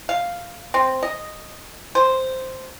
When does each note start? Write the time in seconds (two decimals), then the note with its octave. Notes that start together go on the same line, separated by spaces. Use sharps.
0.09 F5
0.74 C4
1.03 D#5
1.95 C5